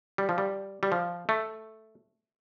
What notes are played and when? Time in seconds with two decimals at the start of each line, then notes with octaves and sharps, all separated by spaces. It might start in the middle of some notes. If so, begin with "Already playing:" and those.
0.18 G3
0.29 F3
0.38 G3
0.83 G3
0.92 F3
1.29 A3